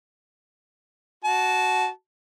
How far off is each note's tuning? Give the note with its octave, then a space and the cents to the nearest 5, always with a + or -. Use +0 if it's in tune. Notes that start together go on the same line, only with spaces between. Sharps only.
F#4 +0 A5 -20